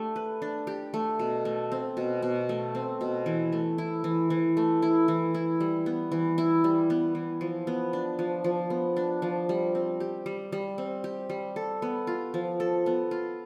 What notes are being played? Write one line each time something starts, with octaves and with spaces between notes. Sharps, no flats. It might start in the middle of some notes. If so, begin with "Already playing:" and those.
Already playing: A3 D4 G4
B4
D4
G4
A3
B2
A3
C4
B2
B2
A3
C4
B2
E3
A3
E4
E3
E3
A3
E4
E3
E4
G3
B3
E3
E4
G3
B3
E3
F3
B3
D4
F3
F3
B3
D4
F3
G3
C4
G4
G3
G3
C4
G4
G3
A4
B3
F4
F3
A4
B3
F4